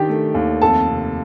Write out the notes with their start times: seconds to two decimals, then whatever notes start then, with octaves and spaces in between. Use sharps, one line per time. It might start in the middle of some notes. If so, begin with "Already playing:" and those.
Already playing: D#3 D4 G4 G5
0.09 A3
0.34 D#2
0.62 F2 A4 A5
0.88 C3